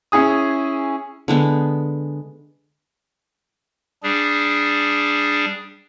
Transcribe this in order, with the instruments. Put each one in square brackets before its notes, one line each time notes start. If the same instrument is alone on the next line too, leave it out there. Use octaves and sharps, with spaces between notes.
[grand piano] C#4 E4 G#4 D#6
[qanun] D3 G#3 B3
[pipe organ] G3 D4 G#4